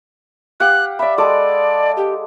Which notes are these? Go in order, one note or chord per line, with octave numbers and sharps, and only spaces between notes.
G4 F5 F#5 F#6
D5 E5 B5
G#3 A4 D5 D6
G4